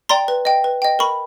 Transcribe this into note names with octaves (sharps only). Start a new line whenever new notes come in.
D5 G5 A#5 C6
B4
D#5 G5
B4
D#5 G5
A#4 B5 C#6